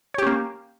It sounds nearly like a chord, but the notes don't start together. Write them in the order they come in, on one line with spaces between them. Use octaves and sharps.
C#5 G4 C#4 A#3